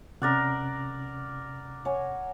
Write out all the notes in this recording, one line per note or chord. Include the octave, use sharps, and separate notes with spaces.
C3 C#4 A#4 D5 F#5
C#5 F#5 G#5